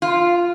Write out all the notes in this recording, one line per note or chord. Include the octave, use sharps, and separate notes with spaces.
F4